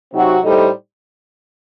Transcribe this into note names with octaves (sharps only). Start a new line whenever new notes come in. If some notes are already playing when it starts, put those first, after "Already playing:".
C3 F#3 C4 D#4 F#4
A2 G3 D#4 A4 C5